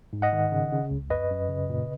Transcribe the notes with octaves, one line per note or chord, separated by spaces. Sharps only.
G#2
D#5 F#5
D#3
C#3
C#3
C#2
F#2 B4 D#5
F#2
C#3
A#2